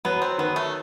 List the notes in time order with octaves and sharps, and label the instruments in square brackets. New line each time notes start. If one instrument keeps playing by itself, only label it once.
[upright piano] F#3 [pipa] B3
[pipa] C4
[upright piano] D#3 [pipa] B3
[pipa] A3